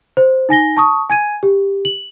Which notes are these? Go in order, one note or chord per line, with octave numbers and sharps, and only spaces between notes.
C5
D#4 G#5 A#6 G7
A5 C#6 D#6
G#5 G#6 D#7
G4
F#7